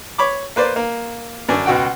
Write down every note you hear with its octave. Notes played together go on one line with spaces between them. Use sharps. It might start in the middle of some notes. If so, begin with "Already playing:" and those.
C#5 B5 D6
A#3 B4 C5 D5
A#3
F#2 D3 D4 G#5
C#2 B2 F#4 F#5 G5